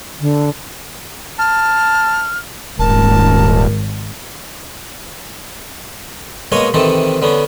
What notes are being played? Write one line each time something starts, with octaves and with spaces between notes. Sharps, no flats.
D3
A5 F6
D#1 G#1 A#4 A5
B2 G#3 A#3 C#5 D#5
C3 D#3 E3 C4 A4
D3 B3 C#4